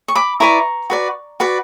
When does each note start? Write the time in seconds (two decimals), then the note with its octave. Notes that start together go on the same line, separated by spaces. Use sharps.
0.08 C#6
0.15 B5 D6
0.40 E4 B4 D5 A#5 C#6
0.90 F#4 B4 D5
1.40 F#4 B4 D5